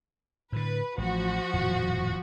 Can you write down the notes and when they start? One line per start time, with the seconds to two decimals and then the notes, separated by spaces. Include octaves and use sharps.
0.52 A2 D3 B4
0.98 A1 F3 F#4
1.53 D#1 F2 A2